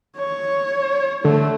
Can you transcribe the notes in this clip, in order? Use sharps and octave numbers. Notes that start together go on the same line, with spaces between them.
C#5
D3 A3